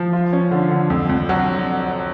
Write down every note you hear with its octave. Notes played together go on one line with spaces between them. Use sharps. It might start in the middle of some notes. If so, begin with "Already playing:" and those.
Already playing: F3
F4
C#4
D3
D3
F2
F2
F#3